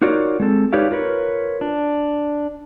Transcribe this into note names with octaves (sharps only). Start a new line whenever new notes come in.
D#4 F4 F#4 A#4 C#5 D5
G#3 C4 A4
D#4 G4 B4 C#5 D5 F5
F4 A#4 B4 C#5
D4